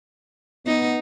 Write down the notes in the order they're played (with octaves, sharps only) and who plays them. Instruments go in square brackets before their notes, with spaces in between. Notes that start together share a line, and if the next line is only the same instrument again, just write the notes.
[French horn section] B3 [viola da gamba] D#4